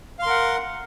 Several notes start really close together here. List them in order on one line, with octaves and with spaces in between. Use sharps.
F5 C6 A#4 F#5